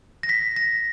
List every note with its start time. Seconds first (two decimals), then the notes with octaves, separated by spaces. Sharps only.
0.23 A#6
0.29 B6
0.56 A#6